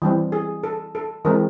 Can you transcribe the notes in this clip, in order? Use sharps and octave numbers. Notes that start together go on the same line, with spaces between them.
E3 G3 C4
G#4
A4
A4
E3 G#3 C4 A#4